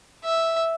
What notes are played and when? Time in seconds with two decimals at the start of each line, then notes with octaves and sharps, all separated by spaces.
0.24 E5